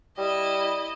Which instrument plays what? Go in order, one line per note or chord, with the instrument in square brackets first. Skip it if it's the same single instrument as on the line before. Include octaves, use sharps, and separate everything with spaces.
[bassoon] G3 [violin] E4 D#5